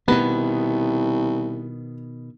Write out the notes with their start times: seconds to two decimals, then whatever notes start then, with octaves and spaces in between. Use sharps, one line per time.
0.08 C2 B2 D#3 B3